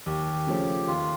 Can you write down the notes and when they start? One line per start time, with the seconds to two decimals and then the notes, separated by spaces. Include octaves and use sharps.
0.06 D#2 G4
0.47 C#3 F3 A3 C#4
0.87 D#2 F4